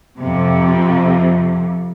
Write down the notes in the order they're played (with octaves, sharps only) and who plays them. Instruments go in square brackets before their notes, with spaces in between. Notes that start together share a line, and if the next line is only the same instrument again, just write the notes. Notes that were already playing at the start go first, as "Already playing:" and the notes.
[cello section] F2 C3